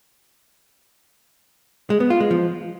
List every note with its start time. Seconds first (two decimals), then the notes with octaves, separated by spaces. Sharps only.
1.90 G#3
2.00 B3
2.10 F4
2.20 G#3
2.31 F3